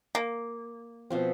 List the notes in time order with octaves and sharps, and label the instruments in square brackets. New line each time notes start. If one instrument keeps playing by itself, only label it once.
[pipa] A#3
[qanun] B2 F3 C4